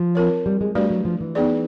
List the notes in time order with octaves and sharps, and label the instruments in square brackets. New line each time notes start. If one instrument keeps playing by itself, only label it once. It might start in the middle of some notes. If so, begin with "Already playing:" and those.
Already playing: [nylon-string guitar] F3
[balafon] C4 F4 A#4 C#5
[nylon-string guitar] G3
G#3
[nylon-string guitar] G3 [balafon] A3 D4 F#4 B4 D5
[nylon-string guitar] F#3
F3
E3
[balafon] B3 D#4 G#4 B4 D5